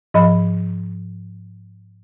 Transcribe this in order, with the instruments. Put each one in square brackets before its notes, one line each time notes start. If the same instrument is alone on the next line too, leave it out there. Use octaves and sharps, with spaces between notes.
[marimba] G#2 F3 D#5 B5